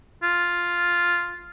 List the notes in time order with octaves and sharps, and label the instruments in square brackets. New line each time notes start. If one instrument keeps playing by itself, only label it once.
[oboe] F4